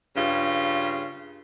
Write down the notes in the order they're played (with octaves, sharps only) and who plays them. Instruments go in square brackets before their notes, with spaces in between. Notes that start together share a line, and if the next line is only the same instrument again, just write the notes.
[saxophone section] G2 C#3 F4